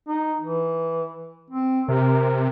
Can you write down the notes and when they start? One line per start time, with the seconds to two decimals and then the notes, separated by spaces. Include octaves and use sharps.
0.08 D#4
0.41 E3
1.50 C4
1.88 C3 A#4